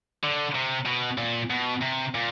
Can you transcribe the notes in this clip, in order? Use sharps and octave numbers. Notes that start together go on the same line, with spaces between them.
D3
C3
B2
A#2
B2
C3
A#2